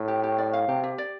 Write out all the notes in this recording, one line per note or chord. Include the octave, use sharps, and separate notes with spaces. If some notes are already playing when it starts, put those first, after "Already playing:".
Already playing: A2
G4
G4
D5
F5
C3 G4
G4
D5